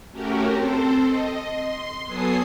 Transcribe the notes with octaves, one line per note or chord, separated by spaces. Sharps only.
A3 C#4 F#4 G4 A#4
C4 A4 C5
D#5
C6
F#3 B3 A4 G#5 D#6 C7